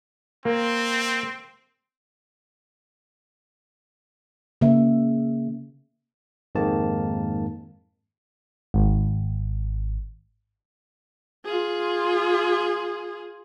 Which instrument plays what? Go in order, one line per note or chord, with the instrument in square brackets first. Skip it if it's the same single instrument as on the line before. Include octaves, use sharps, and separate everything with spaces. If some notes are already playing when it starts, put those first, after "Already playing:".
[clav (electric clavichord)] A#3 [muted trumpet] C4
[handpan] C#3 A#3 E5
[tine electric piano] F2 G#2 D#3 G#3 A#3 A5
[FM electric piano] G#1
[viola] F4 G#4